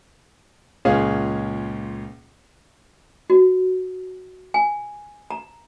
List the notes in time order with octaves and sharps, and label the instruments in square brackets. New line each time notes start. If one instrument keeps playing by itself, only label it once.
[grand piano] C#2 A#2 C#4 G#4 F5
[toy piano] F#4
G#5
A#5